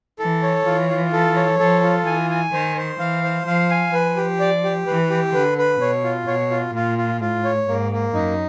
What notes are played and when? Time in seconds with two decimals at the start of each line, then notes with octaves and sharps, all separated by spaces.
0.19 E3 A4
0.43 C#5
0.66 E3 F4
0.89 F4
1.13 A4
1.36 C#5
1.59 F3 A4
1.84 F4
2.06 E3 G#5
2.30 G#5
2.53 D#3 C5
2.77 C5
2.99 E3 F5
3.24 C5
3.47 F3 F5
3.71 G#5
3.93 F3 B4
4.17 G4
4.40 D5
4.64 G4
4.87 E3 B4
5.10 G4
5.34 D3 B4
5.58 B4
5.81 B2 C#5
6.04 F4
6.27 B2 C#5
6.51 F4
6.75 A#2 F4
6.98 F4
7.20 A2 F4
7.44 C#5
7.68 G#2 A#3
7.92 A#3
8.14 F#2 D#4